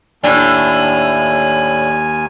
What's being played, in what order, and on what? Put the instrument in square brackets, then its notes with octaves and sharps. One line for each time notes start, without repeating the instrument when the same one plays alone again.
[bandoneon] D#2 G#5 [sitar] A2 D4